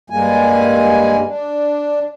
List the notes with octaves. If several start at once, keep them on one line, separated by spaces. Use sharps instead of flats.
G2 G3 G#3 A#3 G#5
D4